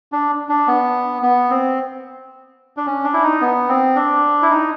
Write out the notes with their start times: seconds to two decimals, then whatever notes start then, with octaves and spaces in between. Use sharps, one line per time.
0.12 D4
0.49 D4
0.67 B3
1.22 B3
1.50 C4
2.77 D4
2.87 C#4
3.04 D4
3.14 E4
3.23 D#4
3.41 B3
3.68 C4
3.96 D4
4.42 E4
4.51 D#4